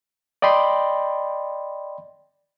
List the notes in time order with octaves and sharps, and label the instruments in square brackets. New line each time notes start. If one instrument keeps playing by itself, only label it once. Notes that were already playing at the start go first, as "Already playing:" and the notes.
[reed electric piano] D5 D#5 G5 B5 C6